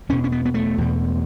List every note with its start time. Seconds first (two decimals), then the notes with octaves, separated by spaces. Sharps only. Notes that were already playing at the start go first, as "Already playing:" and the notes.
0.09 E2 B2 C#4
0.24 C#4
0.32 B3
0.45 B3
0.54 A3
0.78 E2 B2